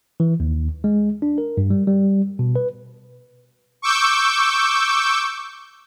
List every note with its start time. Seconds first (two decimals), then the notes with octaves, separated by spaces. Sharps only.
0.20 E3
0.40 D#2
0.84 G#3
1.22 D4
1.38 A#4
1.57 G2
1.70 G3
1.87 G3
2.39 B2
2.56 B4
3.82 C#6 D6 E6 G6